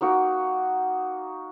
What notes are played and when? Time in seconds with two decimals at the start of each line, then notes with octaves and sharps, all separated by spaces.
0.01 A#3 D#4 F#4 A#4